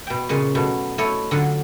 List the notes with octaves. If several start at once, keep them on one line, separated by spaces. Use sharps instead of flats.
B2 G5
A#2 C#3 C#5 D#5 C6
B2 F#3 A3
A3 E4 C#5 D#5
D3 F#3 F4